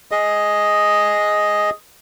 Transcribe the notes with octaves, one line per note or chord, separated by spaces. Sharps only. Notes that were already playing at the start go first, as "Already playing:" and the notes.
G#4 D#5